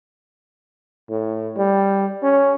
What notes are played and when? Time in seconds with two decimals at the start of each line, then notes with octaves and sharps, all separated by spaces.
1.10 A2
1.57 G3
2.23 C#4